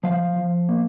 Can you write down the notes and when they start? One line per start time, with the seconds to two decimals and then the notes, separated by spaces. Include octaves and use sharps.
0.03 F3 F5
0.36 F3
0.69 A#3